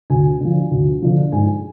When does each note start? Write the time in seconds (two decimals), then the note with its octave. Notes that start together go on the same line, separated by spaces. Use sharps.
0.10 D2 G#5
0.41 D3 F3
0.71 D2
1.02 D3 F3
1.32 G#2 G#5